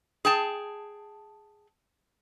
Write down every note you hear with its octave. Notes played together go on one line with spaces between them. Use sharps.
G#4 G5 A5